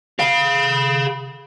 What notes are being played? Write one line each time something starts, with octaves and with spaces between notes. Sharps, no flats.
G#4 F5